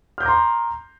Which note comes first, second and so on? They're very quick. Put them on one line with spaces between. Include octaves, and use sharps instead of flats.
F6 G6 D6 A#5 C6